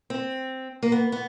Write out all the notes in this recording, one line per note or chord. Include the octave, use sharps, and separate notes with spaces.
C4
A#3
B3
B3